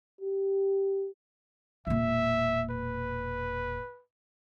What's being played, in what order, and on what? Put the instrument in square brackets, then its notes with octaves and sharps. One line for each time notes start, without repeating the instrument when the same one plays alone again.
[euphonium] G4
[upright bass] E1 A#2 [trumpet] E5
[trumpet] B4